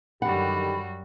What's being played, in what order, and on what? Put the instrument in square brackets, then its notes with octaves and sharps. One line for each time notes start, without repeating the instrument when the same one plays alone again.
[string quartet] F#2 G3 F#4 [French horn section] D3 D#3 G4 [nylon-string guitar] F#5 [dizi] B5